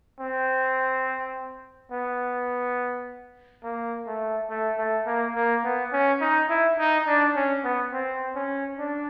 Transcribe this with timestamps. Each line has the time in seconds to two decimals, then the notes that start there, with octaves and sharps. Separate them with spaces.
0.20 C4
1.92 B3
3.64 A#3
4.06 A3
4.49 A3
4.78 A3
5.07 A#3
5.35 A#3
5.64 B3
5.92 C#4
6.21 D#4
6.49 E4
6.79 D#4
7.07 D4
7.35 C#4
7.64 B3
7.93 C4
8.35 C#4
8.79 D4